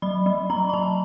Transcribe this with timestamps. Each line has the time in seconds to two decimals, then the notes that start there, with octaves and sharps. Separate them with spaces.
0.02 F#3 B5
0.26 F#3
0.50 F#3 A#5
0.69 A#5
0.73 F#3 A5